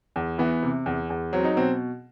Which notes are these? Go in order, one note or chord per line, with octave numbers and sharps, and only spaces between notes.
E2
E3 B3
C3
E2
E2
F#3 C4
D#4
B2 C4